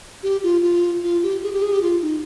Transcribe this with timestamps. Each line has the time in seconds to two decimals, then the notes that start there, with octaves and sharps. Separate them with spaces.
0.23 G4
0.43 F4
0.63 F4
1.03 F4
1.23 G4
1.43 G#4
1.53 G4
1.62 G#4
1.72 G4
1.82 F4
2.02 D#4